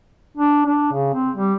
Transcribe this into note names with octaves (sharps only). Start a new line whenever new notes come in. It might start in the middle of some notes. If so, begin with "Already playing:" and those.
D4
D4
C#3
C4
G3